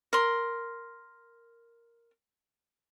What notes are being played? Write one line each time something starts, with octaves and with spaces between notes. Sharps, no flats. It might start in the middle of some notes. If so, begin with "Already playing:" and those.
A#4 C6